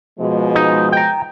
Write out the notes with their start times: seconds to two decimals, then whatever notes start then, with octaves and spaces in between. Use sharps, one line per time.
0.19 B2 F3 G#3
0.55 D#4
0.92 G5 A#5